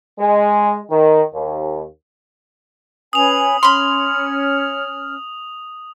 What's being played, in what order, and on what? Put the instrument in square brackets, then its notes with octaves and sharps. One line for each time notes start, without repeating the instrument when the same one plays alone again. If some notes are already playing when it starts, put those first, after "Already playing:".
[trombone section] G#3
D#3
D#2
[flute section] C#4 B4 G#5 [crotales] D#6 F7
[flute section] C#4 F6 [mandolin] B5 C6